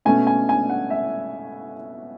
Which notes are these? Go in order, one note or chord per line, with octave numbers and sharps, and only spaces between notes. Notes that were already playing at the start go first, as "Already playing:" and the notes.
B2 A3 C#4 G#5
G#5
G#5
F#5
E5